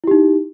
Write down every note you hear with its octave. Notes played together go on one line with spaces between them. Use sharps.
D#4 E4 G4